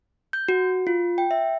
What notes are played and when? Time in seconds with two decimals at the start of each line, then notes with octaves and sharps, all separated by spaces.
0.33 G6
0.48 F#4
0.87 F4
1.18 G5
1.31 E5